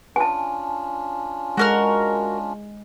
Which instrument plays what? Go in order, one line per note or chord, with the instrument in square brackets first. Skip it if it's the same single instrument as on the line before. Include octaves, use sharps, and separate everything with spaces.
[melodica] C#4 D4 F4 [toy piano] G#5 A5
[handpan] G#3 [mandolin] F#4 A#4 F6